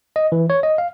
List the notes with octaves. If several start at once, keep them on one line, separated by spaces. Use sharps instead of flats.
D#5
E3
C#5
D#5
F5